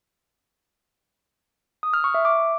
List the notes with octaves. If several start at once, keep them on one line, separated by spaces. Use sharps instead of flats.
D#6
F6
C#6
E5
D6